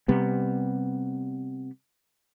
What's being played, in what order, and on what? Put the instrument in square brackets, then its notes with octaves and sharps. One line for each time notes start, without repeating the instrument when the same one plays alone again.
[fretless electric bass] C3 G3 B3